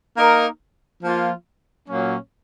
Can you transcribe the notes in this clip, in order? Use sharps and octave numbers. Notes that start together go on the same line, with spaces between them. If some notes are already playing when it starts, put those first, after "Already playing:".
A#3 D#4 A#4
F3 A#3 F4
A#2 F#3 A#3 C#4